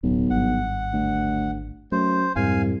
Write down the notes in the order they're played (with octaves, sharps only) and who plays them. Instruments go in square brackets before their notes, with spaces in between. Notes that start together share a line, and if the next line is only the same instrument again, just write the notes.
[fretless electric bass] D1 [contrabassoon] B1
[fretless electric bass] G#1 G2 [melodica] F#5
[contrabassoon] D2
[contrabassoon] F#2 [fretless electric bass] A3 [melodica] C5
[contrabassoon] C2 [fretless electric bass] F2 G#2 [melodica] F5 G#5